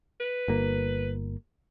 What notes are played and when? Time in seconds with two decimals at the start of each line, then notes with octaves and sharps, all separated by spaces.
0.20 B4
0.48 G1 A#3